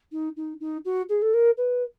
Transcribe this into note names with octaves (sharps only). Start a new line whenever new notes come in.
D#4
D#4
D#4
F#4
G#4
A4
A#4
B4